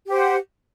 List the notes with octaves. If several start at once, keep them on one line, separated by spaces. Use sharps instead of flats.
G4 C5 F#5